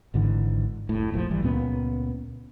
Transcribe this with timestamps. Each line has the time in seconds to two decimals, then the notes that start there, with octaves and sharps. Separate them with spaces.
0.14 G#1 G#2 D3 E3
0.89 F1 A2
1.12 F1 A#1 G#2 F3
1.30 G1 E3 G3
1.43 C#2 A#2 B3 C#4